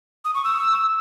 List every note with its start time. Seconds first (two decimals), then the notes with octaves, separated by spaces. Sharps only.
0.25 D#6
0.35 C#6
0.44 E6